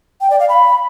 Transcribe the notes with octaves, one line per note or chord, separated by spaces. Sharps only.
G5
D5
F5
B5